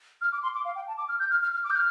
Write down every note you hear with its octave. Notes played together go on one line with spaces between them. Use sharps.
F6
D6
C6
D6
F5
G5
A5
D6
F6
G6
F6
F6
F6
D6
G6
F6